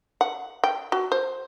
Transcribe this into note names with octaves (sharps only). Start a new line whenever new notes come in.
F#5
G5
F#4
C5